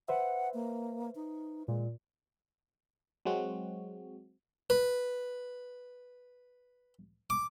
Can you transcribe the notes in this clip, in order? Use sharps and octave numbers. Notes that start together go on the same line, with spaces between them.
B4 C5 E5 F#5
A#3
D#4
A#2 G#3
F#3 G#3 C4 F#4
B4
D6